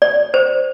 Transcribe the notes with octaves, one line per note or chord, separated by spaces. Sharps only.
D5
C5